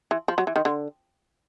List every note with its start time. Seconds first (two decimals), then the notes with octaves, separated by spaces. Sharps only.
0.11 E3
0.28 F3
0.38 F#3
0.47 E3
0.56 D#3
0.65 D3